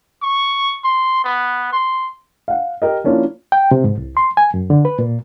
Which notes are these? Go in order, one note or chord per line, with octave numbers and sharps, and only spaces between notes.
C#6
C6
B3
C6
F5 F#5
G4 A#4 D#5
F3 A#3 C#4 D4 E4 F4
G5
C3
G#2
C2
C6
G#5
F#2
D3
B4
A#2